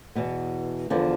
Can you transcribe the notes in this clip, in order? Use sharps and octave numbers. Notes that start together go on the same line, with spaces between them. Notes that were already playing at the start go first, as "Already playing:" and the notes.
E2 B2 B3
E2 D3 F3 B3